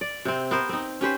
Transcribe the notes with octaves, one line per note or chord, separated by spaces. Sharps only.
D5
C3 C4
B3 A#4 C5
C4 D#4
C#4 G4 B4 C5